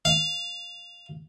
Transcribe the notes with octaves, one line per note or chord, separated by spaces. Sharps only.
F5